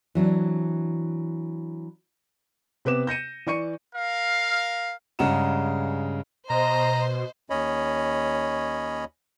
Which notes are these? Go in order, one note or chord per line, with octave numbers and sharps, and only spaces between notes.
E3 F#3 C4 D4
C3 B3 B4 D6 E7
G6 A#6 C#7 D#7
E3 D5 C#6 C#7 D#7
A#4 F5
G2 C#3 G#3 F#5 A#5 E7
B2 C5 D#5 A#5
D#2 C#4 C#5 D#5 B5